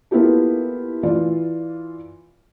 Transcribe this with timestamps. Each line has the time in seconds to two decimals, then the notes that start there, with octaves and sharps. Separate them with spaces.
0.11 A#3 B3 E4 F4 G4 A4
1.03 E3 F4 D5